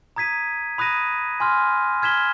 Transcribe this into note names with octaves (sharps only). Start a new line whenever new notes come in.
A#5 D#6 G#6 B6 D#7
B5 D#6 F#6 A#6 D#7
G#5 C6 F6
F6 G#6 B6 E7 G7